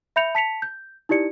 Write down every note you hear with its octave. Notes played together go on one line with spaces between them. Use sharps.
E5 B5 G6 C#7 F7
A5 B6 C#7 F7
G6
D#4 E4 G4 D5 C#7